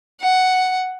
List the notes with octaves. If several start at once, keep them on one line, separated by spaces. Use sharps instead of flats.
F#5